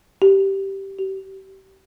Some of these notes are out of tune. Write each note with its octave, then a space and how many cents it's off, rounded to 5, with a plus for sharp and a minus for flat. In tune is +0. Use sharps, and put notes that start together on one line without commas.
G4 -10
G4 -35